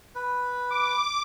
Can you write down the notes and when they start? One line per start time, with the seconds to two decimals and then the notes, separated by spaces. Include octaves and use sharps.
0.15 B4
0.70 D6